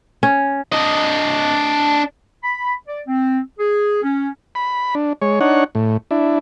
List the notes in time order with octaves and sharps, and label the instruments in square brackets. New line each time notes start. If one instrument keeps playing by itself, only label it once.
[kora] C#4
[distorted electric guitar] D4 D#5
[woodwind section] B5
D5
C4
G#4
C#4
[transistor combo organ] B5
D4
G#3 C#5
D4 D#4 C#5 F#5
A2
D4 E4